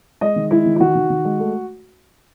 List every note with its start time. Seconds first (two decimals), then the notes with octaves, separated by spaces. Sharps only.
0.21 G#3 D#5
0.36 D#3
0.51 G#3 E4
0.66 D#3
0.76 E4
0.80 D#3 F#4
0.95 D#3
1.10 D#3
1.25 G#3
1.39 A3